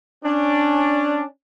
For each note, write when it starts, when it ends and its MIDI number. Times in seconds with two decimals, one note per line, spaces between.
0.24 1.23 61
0.24 1.23 62